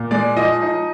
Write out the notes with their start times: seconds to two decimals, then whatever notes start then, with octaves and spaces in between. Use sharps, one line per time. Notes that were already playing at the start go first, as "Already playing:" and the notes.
Already playing: A#2
0.11 G#3 D5
0.36 F3 D#5
0.62 D#4